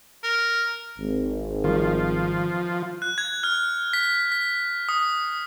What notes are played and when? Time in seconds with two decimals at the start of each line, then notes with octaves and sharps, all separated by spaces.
0.24 A#4
0.99 G#1
1.64 D#3 F3 G3
3.02 F#6
3.18 G#6
3.43 F6
3.93 B6
4.32 B6
4.89 D#6